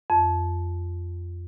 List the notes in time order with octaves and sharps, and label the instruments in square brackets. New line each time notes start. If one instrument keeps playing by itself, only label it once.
[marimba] F2